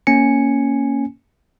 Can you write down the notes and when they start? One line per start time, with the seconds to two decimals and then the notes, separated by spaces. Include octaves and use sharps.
0.07 A#3 C#4 G#5 C#7